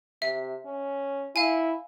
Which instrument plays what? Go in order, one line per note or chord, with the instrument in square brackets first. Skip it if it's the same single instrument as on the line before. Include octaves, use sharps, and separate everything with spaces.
[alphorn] C3 [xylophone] E5
[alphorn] C#4
[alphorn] E4 [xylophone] F5 G#5